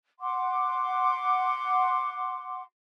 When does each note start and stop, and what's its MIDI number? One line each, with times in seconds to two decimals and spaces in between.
0.20 2.63 78
0.20 2.63 84
0.20 2.63 86